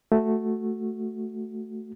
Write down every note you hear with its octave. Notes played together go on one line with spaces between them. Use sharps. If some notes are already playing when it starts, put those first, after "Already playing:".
A3 F#4